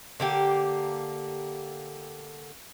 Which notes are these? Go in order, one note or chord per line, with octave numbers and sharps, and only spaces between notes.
D3 A#3 G4